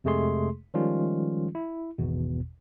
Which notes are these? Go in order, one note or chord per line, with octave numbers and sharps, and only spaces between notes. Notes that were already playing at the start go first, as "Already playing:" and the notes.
F2 C3 G#3 A3 G#4 C6
D#3 F3 G3 G#3 C#4 F4
E4
G#1 E2 B2